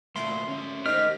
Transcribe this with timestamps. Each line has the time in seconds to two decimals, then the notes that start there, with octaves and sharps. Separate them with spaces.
0.16 D2 A#2 A3 E4 C6
0.48 C#4 C#5 E5
0.86 D#3 A3 C4 G4 C5 D#5 F6